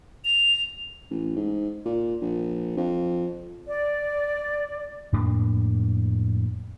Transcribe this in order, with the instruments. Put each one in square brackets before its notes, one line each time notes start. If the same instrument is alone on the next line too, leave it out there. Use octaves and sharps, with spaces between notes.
[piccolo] F7
[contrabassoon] A1
G#2
A#2
A#1
F2
[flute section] D5
[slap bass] F2 A2 A#3 D4